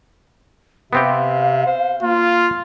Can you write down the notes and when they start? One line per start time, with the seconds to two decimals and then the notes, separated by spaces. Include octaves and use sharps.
0.93 C3 B3 C4 G4 F5
1.67 C5
2.02 A#3 F4